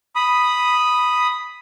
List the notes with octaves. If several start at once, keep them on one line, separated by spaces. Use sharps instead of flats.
B5 D#6